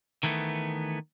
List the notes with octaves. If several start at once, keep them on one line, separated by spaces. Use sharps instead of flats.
D#3 E3 A3 B3